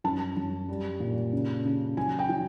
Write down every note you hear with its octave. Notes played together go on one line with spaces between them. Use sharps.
F#2 A5
F#2
G3
A#2
C#3
C#3
F#3 G#5
G5
F#3